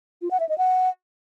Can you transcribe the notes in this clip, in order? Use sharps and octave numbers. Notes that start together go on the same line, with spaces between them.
F4
F#5
E5
D#5
F#5